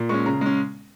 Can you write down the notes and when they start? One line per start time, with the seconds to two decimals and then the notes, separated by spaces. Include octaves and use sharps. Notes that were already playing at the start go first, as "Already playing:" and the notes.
Already playing: A#2
0.09 G#3 C#4 C#6
0.26 C#3 A#5
0.41 G#3 C#4